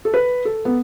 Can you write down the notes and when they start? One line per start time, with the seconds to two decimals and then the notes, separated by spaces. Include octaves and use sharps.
0.05 A4
0.14 B4
0.45 A4
0.65 B3